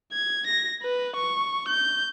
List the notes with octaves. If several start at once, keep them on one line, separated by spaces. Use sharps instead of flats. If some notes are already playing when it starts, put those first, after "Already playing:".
G#6
A#6
B4
C#6
G6